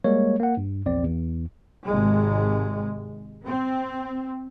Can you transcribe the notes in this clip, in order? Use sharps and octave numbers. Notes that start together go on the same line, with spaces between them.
G3 G#3 A#3 C#5
A#3 F#5
G2
A#1 E2 C4 D5
E2
G#1 C3 G#3
C4